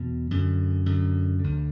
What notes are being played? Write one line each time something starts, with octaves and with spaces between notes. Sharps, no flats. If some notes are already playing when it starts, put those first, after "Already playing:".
Already playing: E2 B2
F#2 D3
F#2 D3
D2 D3